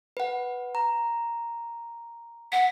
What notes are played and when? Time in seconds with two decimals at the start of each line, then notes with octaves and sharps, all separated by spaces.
0.17 B4 F#5
0.75 A#5
2.52 F#5 B6